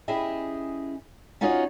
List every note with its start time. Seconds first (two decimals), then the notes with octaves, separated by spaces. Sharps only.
0.08 C#4 E4 G4 G#4 D#5 E5
1.41 C#4 D#4 F4 F#4 C#5 D#5